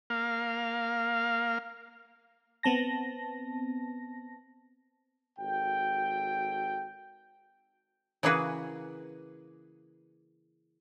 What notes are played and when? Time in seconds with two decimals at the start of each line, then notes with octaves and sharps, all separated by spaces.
0.10 A#3 F5
2.63 B3 C4 A5 A#6
5.39 G#1 F#4 A4 G5
8.23 C#3 E3 A#3 F#4 G#4 B4